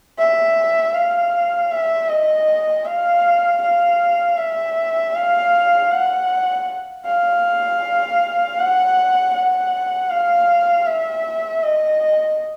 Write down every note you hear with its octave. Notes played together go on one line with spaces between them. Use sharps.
E5
F5
E5
D#5
F5
F5
E5
F5
F#5
F5
F#5
F#5
F5
E5
D#5